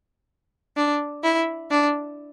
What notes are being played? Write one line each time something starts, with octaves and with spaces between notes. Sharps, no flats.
D4
E4
D4